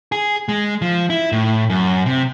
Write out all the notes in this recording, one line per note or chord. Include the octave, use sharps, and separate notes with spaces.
G#4
G#3
F3
E4
A2
F#2
C3